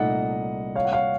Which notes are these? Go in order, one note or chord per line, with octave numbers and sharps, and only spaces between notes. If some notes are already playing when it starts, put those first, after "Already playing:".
Already playing: C2 A#2 A3 D#4 D#5 F#5
C#5 F5
F#5
C#5 F5